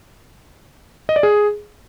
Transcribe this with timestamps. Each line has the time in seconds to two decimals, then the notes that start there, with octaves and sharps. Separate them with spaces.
1.09 D#5
1.16 D5
1.23 G#4